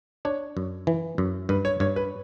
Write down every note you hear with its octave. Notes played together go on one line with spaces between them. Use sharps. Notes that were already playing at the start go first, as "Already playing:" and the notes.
D4 C#5
F#2
E3
F#2
G2 B4
C#5
G2 C#5
B4